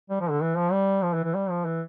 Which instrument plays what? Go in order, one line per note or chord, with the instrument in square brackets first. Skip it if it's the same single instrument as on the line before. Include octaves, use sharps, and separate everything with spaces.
[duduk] G3
F3
D3
E3
F3
G3
F3
E3
E3
G3
F3
E3